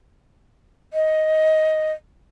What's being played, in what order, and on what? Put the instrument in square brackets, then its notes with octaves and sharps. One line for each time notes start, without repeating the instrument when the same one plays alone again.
[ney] D#5